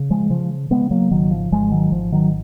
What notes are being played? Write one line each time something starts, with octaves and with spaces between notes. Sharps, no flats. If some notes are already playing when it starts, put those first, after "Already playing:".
Already playing: C#3
F3 G#3
C#3 F3
C#3 G#3 B3
F#3 A#3
G#1 D#3 F#3
F3
G#1 F3 G#3
D#3 F#3
G#1 F3
D#3 F#3